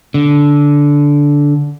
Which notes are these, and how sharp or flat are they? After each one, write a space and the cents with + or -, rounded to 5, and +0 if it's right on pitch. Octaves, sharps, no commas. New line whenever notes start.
D3 -15